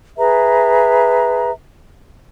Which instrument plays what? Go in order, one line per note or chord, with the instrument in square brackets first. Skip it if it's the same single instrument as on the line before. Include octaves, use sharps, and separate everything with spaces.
[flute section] G#4 B4 E5 A#5